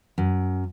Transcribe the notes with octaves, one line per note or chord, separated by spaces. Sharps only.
F#2